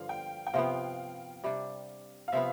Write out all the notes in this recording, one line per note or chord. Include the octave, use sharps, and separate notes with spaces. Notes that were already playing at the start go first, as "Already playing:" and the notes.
Already playing: G2 D3 F3 F5
G5
G5
C3 F3 B3 F5
C3 G3 D4
F5
C3 F3 B3 E5